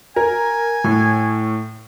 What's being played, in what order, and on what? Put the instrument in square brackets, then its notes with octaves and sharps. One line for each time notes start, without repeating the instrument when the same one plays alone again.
[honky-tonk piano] A#4 [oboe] G#5
[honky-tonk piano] A2